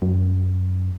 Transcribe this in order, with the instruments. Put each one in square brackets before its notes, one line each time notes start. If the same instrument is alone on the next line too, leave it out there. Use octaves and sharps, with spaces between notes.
[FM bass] F#2